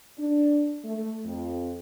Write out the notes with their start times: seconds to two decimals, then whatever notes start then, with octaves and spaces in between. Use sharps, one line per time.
0.18 D4
0.83 A3
1.25 F2